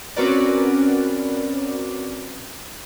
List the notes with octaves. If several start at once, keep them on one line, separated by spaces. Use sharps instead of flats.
C4 C#4 F#4 A#4 B4 D5